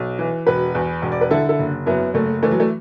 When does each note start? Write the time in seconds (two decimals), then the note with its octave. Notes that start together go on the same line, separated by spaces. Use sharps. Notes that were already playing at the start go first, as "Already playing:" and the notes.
Already playing: B1
0.19 E3
0.46 E1 F#4 B4
0.75 E2
1.02 E1
1.12 D5
1.21 B4
1.31 D3 E4 A4
1.49 E4 A4
1.59 F#1
1.86 F#2 B3 E4
2.14 F#1 A3
2.43 E3 A3
2.51 F#3
2.60 A3